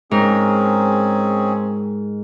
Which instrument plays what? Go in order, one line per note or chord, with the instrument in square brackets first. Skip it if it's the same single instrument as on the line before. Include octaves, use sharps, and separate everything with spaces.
[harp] G#2 A#4 [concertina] C4 C#4 G#4